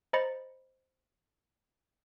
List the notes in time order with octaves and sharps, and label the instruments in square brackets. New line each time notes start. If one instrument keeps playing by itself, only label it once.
[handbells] C5 D#5 A#5 B5 A6 C#7